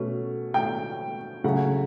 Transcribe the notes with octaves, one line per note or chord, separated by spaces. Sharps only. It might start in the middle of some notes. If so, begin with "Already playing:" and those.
Already playing: B2 A3 C#4
G5
C#3 F#3 A3 F#5